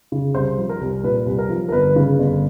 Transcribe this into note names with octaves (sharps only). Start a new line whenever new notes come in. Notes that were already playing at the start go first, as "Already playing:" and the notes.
C#3
C2 C5
F3
A#4
C2
A#2 B4
C2
A#4
F3
A#4
G1 B4
C#3
G1